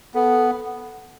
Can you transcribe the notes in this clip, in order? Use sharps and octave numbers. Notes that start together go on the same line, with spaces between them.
B3 A4